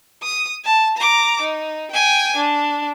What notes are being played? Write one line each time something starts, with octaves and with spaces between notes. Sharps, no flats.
D#6
A5
A#5 D6
D#4
G5 G#5
D4